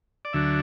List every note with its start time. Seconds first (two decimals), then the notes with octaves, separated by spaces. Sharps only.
0.25 D5
0.33 D2 D3 F#3 D4 E5